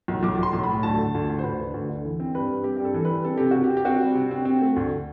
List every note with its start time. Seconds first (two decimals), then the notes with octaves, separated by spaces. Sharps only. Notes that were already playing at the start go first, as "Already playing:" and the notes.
0.08 B1
0.23 B1 D6
0.38 B1
0.43 C6
0.53 B1
0.63 A2 B5
0.83 D2 A5
0.98 D3
1.14 D2
1.29 D2
1.39 C5
1.43 D2 B4
1.60 D3
1.74 D2
1.90 D3
2.05 E3
2.20 C4
2.35 G2 B4
2.49 G2
2.64 C4 G4
2.77 G2 G4
2.85 A4
2.94 E3
3.05 G3 B4
3.25 C4 A4
3.37 C3 G4
3.51 C3 F#4
3.64 G4
3.70 C4
3.77 G4
3.85 C4 F#4
4.01 G3
4.15 C3
4.31 C4
4.45 C4
4.61 A3
4.76 D2